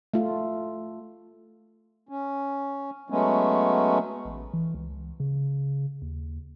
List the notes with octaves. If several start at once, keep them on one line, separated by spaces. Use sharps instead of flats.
A3 F4
C#4
F#3 G#3 A3 B3 C#4
A1
E3
C#2
C#3
D#2